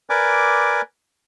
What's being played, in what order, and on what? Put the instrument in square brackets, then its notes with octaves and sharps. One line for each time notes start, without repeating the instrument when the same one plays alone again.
[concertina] A#4 B4 D5 G#5 D6